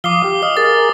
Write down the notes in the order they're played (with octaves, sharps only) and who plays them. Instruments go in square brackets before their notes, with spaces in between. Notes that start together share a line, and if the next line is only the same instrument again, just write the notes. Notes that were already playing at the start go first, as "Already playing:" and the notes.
[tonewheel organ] F3 F5 D#6 [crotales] D6 C7 G7
[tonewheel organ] G4
[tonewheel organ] D#5 F5 [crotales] D#6
[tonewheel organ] G#4 A#4 [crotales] D#6 A6